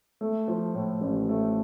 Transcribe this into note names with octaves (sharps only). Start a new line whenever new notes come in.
A3
F3
A2
A1
A3